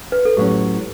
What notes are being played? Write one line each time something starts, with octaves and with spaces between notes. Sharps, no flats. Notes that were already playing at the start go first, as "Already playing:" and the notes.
B4
A4
A2 F#3 C#4 G4